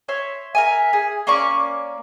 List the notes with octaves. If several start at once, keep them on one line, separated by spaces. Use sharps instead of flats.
C#5 E5 C6
A#4 E5 G#5
G#4
A#3 C#4 D5 C#6